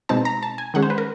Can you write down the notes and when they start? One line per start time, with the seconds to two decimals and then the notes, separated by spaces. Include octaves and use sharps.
0.09 B2 G#3 C4 D#4 A5
0.25 A#5
0.43 A5
0.58 G#5
0.74 D#3 G#3 C#4 F#5
0.82 C5
0.90 B4
0.98 A#4